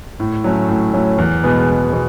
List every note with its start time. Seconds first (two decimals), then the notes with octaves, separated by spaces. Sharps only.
0.20 A2
0.44 F#3 A3 C#4
0.68 A2
0.93 F#3 A3 C#4
1.18 E2
1.44 B2 G#3 B3
1.69 E2
1.93 B2